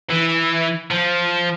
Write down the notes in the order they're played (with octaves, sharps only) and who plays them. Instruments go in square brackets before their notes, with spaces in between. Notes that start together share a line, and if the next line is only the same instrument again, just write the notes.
[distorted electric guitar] E3
F3